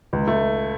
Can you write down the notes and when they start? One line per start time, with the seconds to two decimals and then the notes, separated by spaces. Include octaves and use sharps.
0.13 C#2
0.27 A3